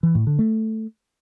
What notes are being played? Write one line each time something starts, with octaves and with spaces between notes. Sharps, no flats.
E3
A2
D3
A3